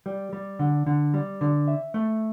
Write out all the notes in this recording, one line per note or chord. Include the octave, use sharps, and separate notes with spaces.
G3
G3
D3
D3
G3
D3
E5
A3